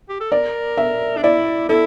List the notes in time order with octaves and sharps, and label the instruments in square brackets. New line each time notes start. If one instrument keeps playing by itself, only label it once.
[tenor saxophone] G4
A4
[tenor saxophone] A#4 [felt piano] D5
[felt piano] E5
[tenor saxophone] D4
[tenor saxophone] E4 [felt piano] D5
[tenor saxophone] E4 [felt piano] A4